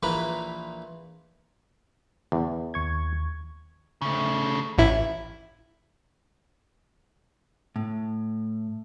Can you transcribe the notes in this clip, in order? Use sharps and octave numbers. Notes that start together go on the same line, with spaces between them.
A#1 A#2 E3 A#3 B4 B5
E2
D#2 C#6 G#6
C#3 A3
A1 E4
A2